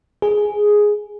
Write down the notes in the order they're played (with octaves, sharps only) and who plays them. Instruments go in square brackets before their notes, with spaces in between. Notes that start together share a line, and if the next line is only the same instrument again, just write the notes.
[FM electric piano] G#4